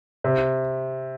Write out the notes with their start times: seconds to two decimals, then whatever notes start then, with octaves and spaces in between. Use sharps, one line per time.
0.24 C3